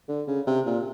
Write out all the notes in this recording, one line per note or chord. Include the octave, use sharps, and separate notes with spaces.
D3
C#3
C3
A#2